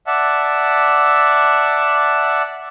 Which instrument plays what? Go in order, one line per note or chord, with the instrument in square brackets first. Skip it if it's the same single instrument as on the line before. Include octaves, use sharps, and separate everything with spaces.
[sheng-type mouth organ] D5 E5 F#5 A5